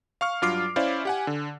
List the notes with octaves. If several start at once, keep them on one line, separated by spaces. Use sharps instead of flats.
F5 C#6 F6
G2 F#3 F4 D6 F6 C7
C#4 E4 C5 D5 E5 F5
G4 F#5 G#5
D3